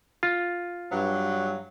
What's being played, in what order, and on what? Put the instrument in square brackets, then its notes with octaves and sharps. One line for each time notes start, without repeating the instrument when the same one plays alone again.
[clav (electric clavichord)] F4
[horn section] G2 F#3